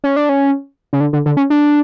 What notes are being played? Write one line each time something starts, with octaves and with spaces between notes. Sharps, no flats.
C#4
D4
C#4
C#3
D3
D3
D3
C#4
D4